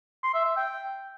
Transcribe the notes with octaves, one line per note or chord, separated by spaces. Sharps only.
C6
E5
E5
G5